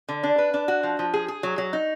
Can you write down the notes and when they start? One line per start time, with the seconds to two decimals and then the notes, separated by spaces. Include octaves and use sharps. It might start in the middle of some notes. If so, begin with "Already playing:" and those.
0.09 D3
0.23 D4
0.38 B4
0.54 D4
0.68 F#4
0.83 F3
0.99 F3
1.14 G#4
1.28 G#4
1.43 F#3
1.58 F#3
1.73 D#4